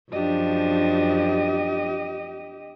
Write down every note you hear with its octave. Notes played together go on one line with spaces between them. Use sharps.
F#2 F3 D4 G4 D#5